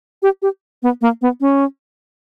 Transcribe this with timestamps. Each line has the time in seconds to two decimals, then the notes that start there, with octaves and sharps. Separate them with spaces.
0.23 G4
0.42 G4
0.83 B3
1.01 A#3
1.22 B3
1.41 C#4